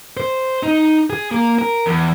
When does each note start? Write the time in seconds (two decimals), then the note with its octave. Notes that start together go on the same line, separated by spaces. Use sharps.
0.17 C5
0.63 D#4
1.10 G#4
1.31 A#3
1.59 A#4
1.86 E2